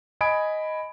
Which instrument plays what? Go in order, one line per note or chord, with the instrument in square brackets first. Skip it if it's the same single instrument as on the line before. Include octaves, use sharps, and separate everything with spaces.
[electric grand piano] D#5 G#5 B5 D#6 G#6 D7